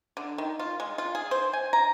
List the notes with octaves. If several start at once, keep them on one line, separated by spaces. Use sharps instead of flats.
D3
D#3
F4
G#3
F4
G#4
C5
G#5
A#5